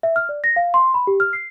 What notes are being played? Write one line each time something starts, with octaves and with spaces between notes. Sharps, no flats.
E5
F6
D5
A#6
F5
C6
B5
G4
F6
C7